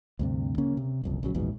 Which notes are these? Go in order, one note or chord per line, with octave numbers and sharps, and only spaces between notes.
D2 G2 C3
C#3 A#3 C#4
C3
F#1 C2 F2
A#1 C#3 F#3
A#1 E2 G#2 B2